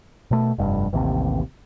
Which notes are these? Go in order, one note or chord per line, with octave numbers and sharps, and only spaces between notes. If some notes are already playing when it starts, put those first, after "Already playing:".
B2 A3
F1 G2
A1 D#2 C3